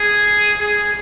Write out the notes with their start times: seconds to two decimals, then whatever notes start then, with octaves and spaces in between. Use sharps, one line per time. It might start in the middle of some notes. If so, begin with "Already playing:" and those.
Already playing: G#4
0.60 G#4